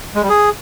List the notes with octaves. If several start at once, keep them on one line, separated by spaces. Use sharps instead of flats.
G#3
G3
G#4